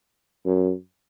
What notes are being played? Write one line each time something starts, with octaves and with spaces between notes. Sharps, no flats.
F#2